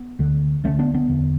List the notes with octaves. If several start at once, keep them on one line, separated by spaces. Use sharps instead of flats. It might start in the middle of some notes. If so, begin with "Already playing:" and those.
Already playing: B3
D2 D3
D2 D3 A3 C#4
B3 D4
B3 D4
E2 D3